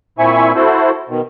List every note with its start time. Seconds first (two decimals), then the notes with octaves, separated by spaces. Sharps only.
0.19 A#2 C4 E4 E5 G#5 C#6
0.55 E4 F#4 A4 C5
1.09 B2 D#3